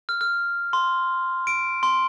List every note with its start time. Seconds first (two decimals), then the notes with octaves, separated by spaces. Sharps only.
0.09 F6
0.21 F6
0.73 C6
1.47 D7
1.83 C6